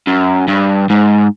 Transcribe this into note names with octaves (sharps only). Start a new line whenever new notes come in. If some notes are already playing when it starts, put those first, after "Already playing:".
F#2
G2
G#2